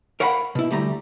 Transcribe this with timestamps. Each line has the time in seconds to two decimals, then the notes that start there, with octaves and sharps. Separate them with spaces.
0.20 A#4 C#5 F5 F#5 A#5 B5
0.55 B2 E4
0.71 D2 G3 A3 A#5